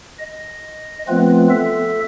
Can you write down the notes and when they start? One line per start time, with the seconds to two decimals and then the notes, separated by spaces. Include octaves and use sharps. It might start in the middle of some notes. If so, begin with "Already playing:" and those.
0.19 D#5
1.08 F3 A3 B3 C4 F4 B4
1.50 A4 E5